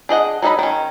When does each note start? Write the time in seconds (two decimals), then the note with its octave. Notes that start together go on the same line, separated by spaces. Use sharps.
0.09 D4 G#4 D#5 F#5
0.42 F#3 D#4 A4 D#5 B5
0.59 D#3 C#4